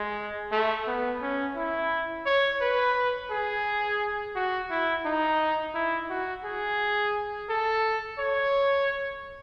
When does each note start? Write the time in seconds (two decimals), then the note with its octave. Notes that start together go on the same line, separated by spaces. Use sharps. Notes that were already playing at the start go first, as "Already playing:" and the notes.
Already playing: G#3
0.52 A3
0.87 B3
1.22 C#4
1.56 E4
2.26 C#5
2.61 B4
3.31 G#4
4.35 F#4
4.71 E4
5.05 D#4
5.75 E4
6.10 F#4
6.45 G#4
7.50 A4
8.19 C#5